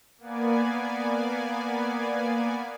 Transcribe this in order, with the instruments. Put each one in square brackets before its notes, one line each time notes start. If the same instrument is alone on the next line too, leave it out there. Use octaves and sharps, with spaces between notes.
[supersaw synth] A#3 B3 D5 G#5